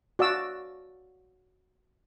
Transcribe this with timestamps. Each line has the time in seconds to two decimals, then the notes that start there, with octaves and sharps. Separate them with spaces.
0.19 F#4 D5 F5 E6